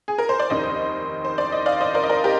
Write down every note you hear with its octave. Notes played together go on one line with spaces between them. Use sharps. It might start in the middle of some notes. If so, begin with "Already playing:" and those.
G#4
A#4
C5
D5
F1 D#2 D#3 C5 D#5
C5
D5
D#5
D5 F5
C5 D#5
A#4 D5
D#5
A#4 D5
G4 A#4